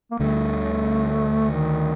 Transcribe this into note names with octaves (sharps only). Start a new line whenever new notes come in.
A#3
D2 D3 G3 A3
D#3